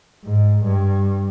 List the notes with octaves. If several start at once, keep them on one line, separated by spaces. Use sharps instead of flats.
G#2
G2